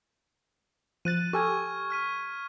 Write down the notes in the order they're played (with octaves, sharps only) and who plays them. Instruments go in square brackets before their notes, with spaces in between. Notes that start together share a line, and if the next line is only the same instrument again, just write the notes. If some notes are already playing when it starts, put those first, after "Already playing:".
[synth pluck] F3 F#6 A6 [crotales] D#7
[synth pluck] G4 A4 G#5 [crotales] C#6 F6 G#6
[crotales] F6 B6 D#7